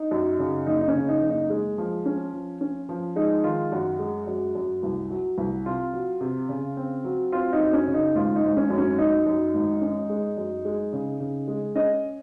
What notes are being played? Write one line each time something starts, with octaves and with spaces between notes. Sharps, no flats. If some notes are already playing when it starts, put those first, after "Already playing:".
Already playing: D#4
F#2
C#3
F#1 D#4
D#4
C#4
C#3
D#4
F#1
D#4
G#3
F3
C#4
F3
C#4
F3
G#3 D#4
D#3 F4
F#2 F#4
G#3
F#2
F#2
C2
F#3
C2
C3 F4
F#3
C3
C#3
C4
F#3
C4 F4
D#4
F#2
C#4
C#3
D#4
G#1 F4
D#4
G#1
C#4
F#2
C#4
F#2 D#4
F#2
G#1
C#4
G#3
F#2
G#3
C#3
C#3
G#3
C#4 D#5